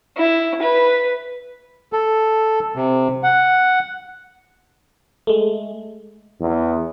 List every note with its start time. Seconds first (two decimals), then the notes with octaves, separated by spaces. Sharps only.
0.17 E4
0.62 B4
1.93 A4
2.76 C3
3.23 F#5
5.27 G#3 A3
6.40 E2